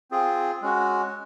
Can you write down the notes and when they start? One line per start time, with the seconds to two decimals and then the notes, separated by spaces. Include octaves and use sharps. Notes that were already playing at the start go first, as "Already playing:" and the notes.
0.11 C4 F4 G#4
0.61 G#3 C#4 F#4